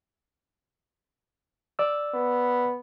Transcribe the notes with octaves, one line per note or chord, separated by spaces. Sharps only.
D5 E6
B3